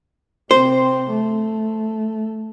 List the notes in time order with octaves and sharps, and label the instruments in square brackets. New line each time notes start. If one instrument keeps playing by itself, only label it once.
[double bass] C3 C4 [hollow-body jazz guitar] C5
[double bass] A3